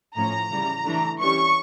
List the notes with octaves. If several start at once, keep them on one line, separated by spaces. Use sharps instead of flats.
A2 F3 C#4 A#5
C#3 E3 G3
E3 A3 D4
E3 G3 C#4 C#6